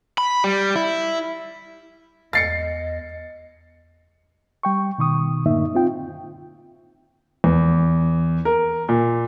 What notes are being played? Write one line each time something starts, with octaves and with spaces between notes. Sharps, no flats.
B5
G3
E4
E2 D#5 A6 C7 C#7
G3 G5 C#6
B2 D#3 C#6 D#6
F#2 A2 D3 A#3 D#4 E5
C4 F4 G5
E2
A#4
A#2